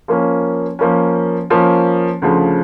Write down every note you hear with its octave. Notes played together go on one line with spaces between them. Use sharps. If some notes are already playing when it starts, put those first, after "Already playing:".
F3 A#3 C#4
F3 A#3 C#4
F3 A#3 C#4
D2 C#3 F3